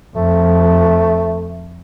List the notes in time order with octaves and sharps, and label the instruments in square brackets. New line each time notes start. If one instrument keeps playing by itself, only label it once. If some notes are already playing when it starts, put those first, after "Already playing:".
[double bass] F2 [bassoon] A3